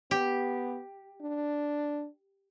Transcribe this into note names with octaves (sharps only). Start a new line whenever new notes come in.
B3 G4
D4